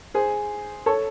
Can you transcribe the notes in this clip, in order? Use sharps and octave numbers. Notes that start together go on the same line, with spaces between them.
G#4 C5
A4 C#5